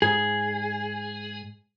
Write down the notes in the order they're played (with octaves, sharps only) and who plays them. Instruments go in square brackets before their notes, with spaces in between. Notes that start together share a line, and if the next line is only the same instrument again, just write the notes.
[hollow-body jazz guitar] G#2 [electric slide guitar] G#4